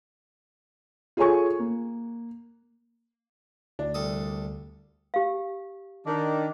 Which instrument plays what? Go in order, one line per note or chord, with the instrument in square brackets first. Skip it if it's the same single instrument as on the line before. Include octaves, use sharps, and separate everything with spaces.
[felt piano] F4 G#4 A4 C#5 G#5 C#6
A#3
[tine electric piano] D2 [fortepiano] D4
[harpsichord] C2 A4 D#6
[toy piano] G4 F5
[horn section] D#3 D4